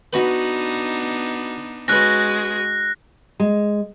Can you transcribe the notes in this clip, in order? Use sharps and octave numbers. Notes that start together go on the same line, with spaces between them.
B3 D4 D#4 F#4 B4
G#3 C#4 F#4 B4 F#6 A#6
G#3